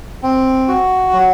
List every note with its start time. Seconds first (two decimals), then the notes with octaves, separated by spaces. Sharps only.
0.23 C4
0.68 F#4
1.13 F#3